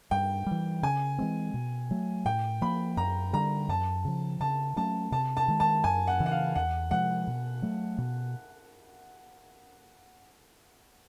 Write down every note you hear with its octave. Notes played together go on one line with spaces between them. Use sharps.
G2 G5
E3 G3
C#3 G#5
E3 G#3 C4
B2
F#3 A3
A2 G5
F3 A#3 B5
F#2 A#5
D3 G3 A#5
F#2 A5
C#3 F3
C#3 A5
F#3 A3 C#4 A5
C3 A5
A5
D#3 G#3
A5
F#2 G#5
F#5
C#3 E3
F#5
F5
E2 F#5
C3 F3 G#3 F#5
B2
F#3 A3
B2